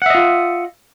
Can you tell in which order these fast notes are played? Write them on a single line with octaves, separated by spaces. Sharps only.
F#5 E5 D#5 F4